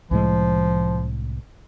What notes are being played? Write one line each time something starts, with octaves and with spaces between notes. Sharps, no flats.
C2 A2 F3 G#3